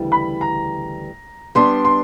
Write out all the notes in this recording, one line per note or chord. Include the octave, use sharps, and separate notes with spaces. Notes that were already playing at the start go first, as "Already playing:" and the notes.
Already playing: D2 C#3 E3 G3
B5
A#5
G3 B3 D4 C6
C6